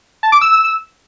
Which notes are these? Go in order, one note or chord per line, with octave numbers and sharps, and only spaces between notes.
A5
D6
E6